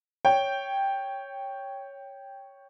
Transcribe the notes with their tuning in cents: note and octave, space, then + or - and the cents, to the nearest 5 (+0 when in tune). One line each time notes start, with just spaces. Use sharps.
C#5 +0 G5 +0